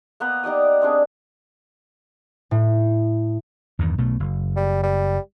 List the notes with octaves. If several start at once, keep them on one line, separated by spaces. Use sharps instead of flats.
A#3 B3 B4 A#5
D#4 G4 D5 D#6
C4 D4 G#4
A2
E2 G2 D#3
B1 B2 A3
F#1
G3
G3